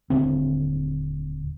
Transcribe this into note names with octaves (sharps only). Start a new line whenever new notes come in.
D#1 G#1 D3 C4